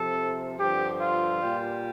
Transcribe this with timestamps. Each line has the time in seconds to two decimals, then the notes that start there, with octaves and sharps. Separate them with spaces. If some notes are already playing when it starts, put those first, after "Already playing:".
Already playing: C3 F3 A4
0.59 G2 D3 F3 G4
1.00 F4
1.41 A#2 G3